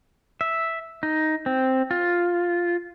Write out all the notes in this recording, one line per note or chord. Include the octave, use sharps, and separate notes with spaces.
E5
D#4
C4
F4